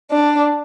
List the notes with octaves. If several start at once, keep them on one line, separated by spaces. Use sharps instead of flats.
D4